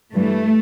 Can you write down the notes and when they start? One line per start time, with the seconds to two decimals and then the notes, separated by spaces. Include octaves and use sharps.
0.14 G2 E3 G3 A3